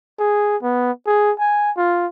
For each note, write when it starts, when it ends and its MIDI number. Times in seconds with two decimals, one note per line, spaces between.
0.19 0.57 68
0.63 0.91 59
1.07 1.32 68
1.39 1.71 80
1.77 2.07 65